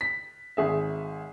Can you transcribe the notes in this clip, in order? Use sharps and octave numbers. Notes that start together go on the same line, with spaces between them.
B6
G#1 G#4 E5